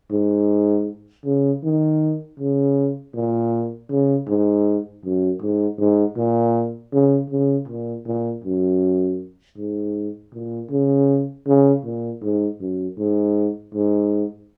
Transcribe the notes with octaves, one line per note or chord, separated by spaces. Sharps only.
G#2
C#3
D#3
C#3
A#2
C#3
G#2
F#2
G#2
G#2
A#2
C#3
C#3
A#2
A#2
F#2
G#2
A#2
C#3
C#3
A#2
G#2
F#2
G#2
G#2